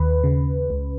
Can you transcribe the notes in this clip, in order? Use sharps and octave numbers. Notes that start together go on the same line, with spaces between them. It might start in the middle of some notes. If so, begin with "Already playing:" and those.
Already playing: D#2 B4
C#3
C#2